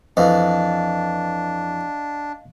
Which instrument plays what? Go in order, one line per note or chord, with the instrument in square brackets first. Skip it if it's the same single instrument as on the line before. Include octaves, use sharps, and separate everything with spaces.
[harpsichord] F2 E3 [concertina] D4 [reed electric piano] D#5 F5